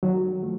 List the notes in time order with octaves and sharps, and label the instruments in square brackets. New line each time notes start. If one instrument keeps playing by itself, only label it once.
[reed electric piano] D#3 F#3
F3 A3